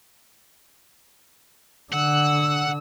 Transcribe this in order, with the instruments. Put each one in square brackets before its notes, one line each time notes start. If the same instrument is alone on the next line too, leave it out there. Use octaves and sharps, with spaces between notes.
[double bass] D3 [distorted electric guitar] F#5 [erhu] E6